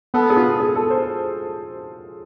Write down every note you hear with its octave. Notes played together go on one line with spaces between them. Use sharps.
B3 A4
G#4
F4
G#4
A4
C5